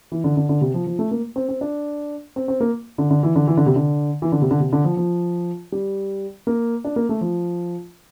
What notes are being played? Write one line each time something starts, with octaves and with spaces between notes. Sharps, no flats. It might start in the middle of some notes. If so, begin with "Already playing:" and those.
E3
D3
D3
D3
C3
F3
F3
A3
A#3
C4
C4
D4
C4
C4
A#3
D3
D3
E3
D3
E3
D3
C3
D3
E3
D3
C3
D3
C3
D3
F3
F3
G3
A#3
D4
A#3
A3
F3